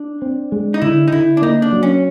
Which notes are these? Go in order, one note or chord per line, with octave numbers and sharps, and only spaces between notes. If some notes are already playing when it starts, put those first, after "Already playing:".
Already playing: D4
C4
G#3
D#4
D3 E4
D#4
D3 E4
D4
A#3 D#4
D4
F#3
C#4